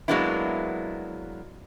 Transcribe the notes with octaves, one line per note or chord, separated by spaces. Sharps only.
F#3 G#3 A#3 B3 D4 E4